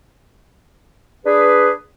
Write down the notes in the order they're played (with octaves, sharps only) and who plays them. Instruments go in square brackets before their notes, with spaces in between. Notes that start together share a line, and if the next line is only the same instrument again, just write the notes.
[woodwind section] D4 G#4 B4